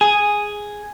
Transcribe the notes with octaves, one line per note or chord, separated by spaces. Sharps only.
G#4